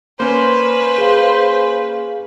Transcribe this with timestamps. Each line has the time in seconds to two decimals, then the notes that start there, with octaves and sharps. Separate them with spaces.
0.20 A#3 C#4 B4 C5
0.98 G#4 F5